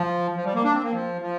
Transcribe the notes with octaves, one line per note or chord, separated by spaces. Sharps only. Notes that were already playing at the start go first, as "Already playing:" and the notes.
Already playing: F3
F3
G3
A#3
D4
C4
A#3
F3
F3